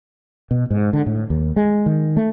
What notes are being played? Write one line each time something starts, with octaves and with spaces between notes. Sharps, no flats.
B2
G#2
D3
A2
D#2
G#3
D#3
A3